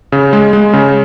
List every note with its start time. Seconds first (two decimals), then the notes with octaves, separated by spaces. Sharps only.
0.12 C#3
0.33 G#3
0.53 G#3
0.73 C#3